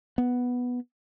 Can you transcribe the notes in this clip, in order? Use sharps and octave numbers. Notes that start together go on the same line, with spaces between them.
B3